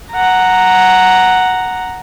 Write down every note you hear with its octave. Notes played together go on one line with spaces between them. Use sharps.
F#5 A#5